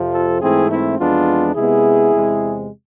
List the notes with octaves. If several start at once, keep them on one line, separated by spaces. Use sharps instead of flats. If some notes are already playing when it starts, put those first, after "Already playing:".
Already playing: F2 C3 F3
F4 A4
G#2 E3 A3 C4 E4 G#4
C4 E4
F2 E3 G#3 B3 D4 F4
C3 G#3 B3 E4 G#4
E2 C3 G#3 C4